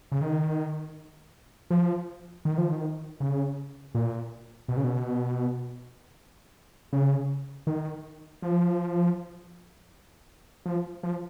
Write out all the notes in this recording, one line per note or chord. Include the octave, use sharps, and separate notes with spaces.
C#3
D#3
F3
D#3
F3
D#3
C#3
A#2
B2
C#3
B2
C#3
D#3
F3
F3
F3